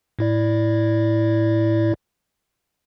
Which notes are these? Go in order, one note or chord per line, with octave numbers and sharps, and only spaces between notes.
A2 E4 D5